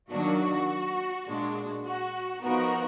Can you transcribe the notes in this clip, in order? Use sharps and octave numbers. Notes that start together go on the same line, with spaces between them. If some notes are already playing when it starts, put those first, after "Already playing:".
D#3 F#3 A#3 D4 F#4
A#2 G#3 D4
F#4
F3 B3 D#4 F#4 A#4